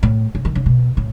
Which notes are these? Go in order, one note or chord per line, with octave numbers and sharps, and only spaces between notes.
A2
C#3
D#3
C#3
B2
A2